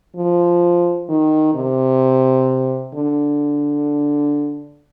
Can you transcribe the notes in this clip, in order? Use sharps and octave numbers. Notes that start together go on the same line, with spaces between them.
F3
D#3
C3
D3